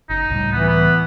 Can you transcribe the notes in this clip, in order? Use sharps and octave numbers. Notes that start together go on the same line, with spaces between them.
F#1 D#4
C#2 A2 G3
E3 B3
B3